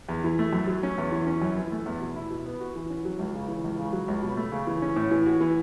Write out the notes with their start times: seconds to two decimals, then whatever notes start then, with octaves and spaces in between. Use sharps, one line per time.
0.09 E2
0.24 E3
0.39 A3
0.53 F#2
0.67 F#3
0.83 C#4
0.98 E2
1.12 E3
1.26 C#4
1.42 F#2
1.57 E3
1.72 A3
1.86 E2
2.01 B2
2.16 E4
2.30 B2
2.46 B3
2.60 F#4
2.76 E3
2.90 C#4
3.05 F#3
3.19 C#2
3.35 C#3
3.48 E3
3.64 C#2
3.79 C#3
3.93 F#3
4.08 C#2
4.23 B2
4.37 A3
4.52 C#3
4.67 E3
4.82 C#4
4.96 A2
5.11 E3
5.26 F#4
5.41 E3